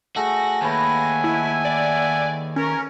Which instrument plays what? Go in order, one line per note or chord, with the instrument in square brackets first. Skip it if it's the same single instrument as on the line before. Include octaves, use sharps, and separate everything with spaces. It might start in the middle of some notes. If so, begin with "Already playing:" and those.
[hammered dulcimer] A3 G#4 [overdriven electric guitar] F#4 [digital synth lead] A#6
[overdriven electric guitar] D#2 [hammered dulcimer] B4 C#5 [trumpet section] E5 F#5 G#5
[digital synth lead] E4
D5
[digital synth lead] C#4 [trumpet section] A#4